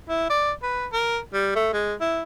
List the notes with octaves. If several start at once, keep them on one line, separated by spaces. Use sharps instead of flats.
E4
D5
B4
A#4
G3
A3
G#3
E4